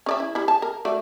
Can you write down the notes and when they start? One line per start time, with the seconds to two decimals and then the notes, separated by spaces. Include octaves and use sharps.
0.06 C#4 D5 E5
0.20 E4
0.35 G3 E4
0.48 A5
0.62 A#4
0.85 A3 F#4 D5